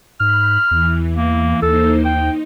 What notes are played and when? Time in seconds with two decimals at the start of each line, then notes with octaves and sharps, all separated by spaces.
0.20 G#2 B5 F6 F#6
0.71 E2 E3
1.16 A#3
1.62 D#2 A#3 D#4 A4 C5
2.05 D#4 G5